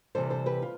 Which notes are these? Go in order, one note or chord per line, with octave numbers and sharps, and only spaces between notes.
C3 E3 G3 A4 C5
A4 C5
G4 B4
F4